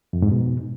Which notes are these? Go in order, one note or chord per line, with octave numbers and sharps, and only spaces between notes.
F2
G#2
B2